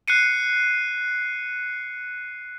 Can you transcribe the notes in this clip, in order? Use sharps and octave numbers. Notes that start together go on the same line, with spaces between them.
F#6 C7 C#7 D#7